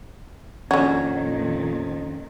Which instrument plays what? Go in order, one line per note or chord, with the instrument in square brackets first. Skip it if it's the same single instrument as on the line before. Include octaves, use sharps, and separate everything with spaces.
[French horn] F2 [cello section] A#2 D#3 [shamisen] D3 F#4 [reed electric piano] C#4 G#6